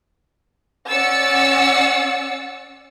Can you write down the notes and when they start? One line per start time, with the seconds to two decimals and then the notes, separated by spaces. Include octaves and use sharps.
0.90 C#4 D5 F#5 E6 A6 C#7